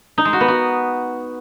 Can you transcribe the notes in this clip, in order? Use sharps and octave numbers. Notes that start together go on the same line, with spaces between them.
D#4
G#3
F#4
B3
F#4